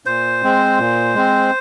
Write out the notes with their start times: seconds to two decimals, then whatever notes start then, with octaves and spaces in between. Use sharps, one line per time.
0.06 A#2 C5
0.43 G#3 C4
0.79 A#2
1.14 G#3 C4